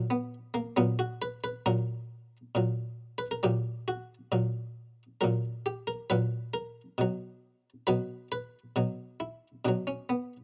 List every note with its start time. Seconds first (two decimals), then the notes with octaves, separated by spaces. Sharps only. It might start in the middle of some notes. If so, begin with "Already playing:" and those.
Already playing: A#2 F#3
0.10 B3
0.54 A#3
0.76 A#2 F#3 B3
0.99 F#4
1.22 B4
1.44 B4
1.66 A#2 F#3 A#4
2.55 A#2 F#3
3.18 B4
3.31 A#4
3.43 A#2 F#3 G4
3.88 F#4
4.32 A#2 F#3
5.21 A#2 F#3 A#4
5.66 G4
5.87 A#4
6.10 A#2 F#3 B4
6.54 A#4
6.98 B2 F#3
7.87 B2 F#3 B4
8.32 B4
8.76 B2 F#3
9.20 E4
9.65 B2 F#3 D4
9.87 C#4
10.09 B3